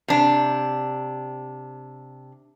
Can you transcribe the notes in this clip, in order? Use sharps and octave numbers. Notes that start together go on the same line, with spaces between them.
C3 D4